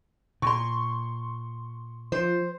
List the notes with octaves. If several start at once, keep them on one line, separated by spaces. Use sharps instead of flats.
A#2 C6 C#6
F3 C5